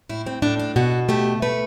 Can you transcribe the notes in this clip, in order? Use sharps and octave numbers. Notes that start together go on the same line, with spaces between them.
A2 E4
C4
A2 D4
D4
B2 F#4
A3 G4
A3 B4